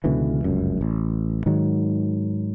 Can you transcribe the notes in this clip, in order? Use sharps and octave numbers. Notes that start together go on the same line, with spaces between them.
C#2 B2 D3 E3
F1 C#2 F#2
A1
G#2 D#3 F#3 G#3